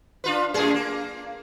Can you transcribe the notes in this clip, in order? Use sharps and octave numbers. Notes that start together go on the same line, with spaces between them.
D4 F4 B4
F#2 A2 G#4
A#3